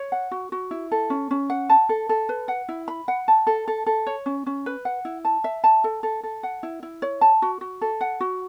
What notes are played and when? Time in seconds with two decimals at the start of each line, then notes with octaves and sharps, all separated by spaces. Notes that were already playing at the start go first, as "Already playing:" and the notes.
Already playing: C#5
0.12 F#5
0.31 F#4
0.52 F#4
0.71 E4
0.92 A4
1.10 C#4
1.31 C#4
1.50 F#5
1.70 A5
1.89 A4
2.09 A4
2.29 B4
2.48 F#5
2.69 E4
2.88 B5
3.08 F#5
3.28 A5
3.47 A4
3.68 A4
3.87 A4
4.07 C#5
4.26 C#4
4.46 C#4
4.66 B4
4.85 F#5
5.05 E4
5.25 A5
5.44 E5
5.64 A5
5.84 A4
6.03 A4
6.23 A4
6.43 F#5
6.63 E4
6.83 E4
7.02 C#5
7.21 A5
7.42 F#4
7.61 F#4
7.81 A4
8.01 F#5
8.21 F#4